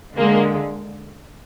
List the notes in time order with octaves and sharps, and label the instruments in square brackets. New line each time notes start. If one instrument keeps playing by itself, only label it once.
[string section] D3 G#3 A#3